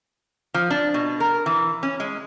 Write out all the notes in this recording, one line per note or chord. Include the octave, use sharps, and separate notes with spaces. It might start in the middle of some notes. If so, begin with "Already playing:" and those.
F3
D4
B2
A#4
E3
C#4
G#3